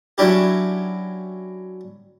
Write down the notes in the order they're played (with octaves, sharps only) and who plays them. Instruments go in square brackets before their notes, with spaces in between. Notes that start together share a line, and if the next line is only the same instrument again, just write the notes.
[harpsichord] F#3 C#4 D4 E4 G4